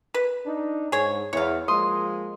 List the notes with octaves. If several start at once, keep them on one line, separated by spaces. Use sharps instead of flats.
B4
D4 D#4
G#2 G#4 C#5
E2 C#5 F5
F3 G#3 A#3 C6 D#6